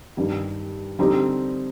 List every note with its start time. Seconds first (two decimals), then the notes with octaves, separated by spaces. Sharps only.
0.17 G2 D#3 G3
0.99 D3 G3 C4 D#4 G4